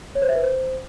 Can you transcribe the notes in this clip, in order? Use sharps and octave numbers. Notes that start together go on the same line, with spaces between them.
C#5
C5
E5
B4
C5